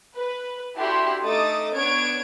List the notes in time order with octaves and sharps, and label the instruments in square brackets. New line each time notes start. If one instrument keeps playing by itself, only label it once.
[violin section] B4
D4 E4 F#4 G4 A4 C6
A3 D#4 A4 D6 D#6 A6
B3 D4 C#5 G#6 D7